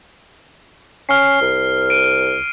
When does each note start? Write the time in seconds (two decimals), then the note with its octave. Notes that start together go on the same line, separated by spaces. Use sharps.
1.09 C#4 F6 C7
1.41 C2
1.90 D7 D#7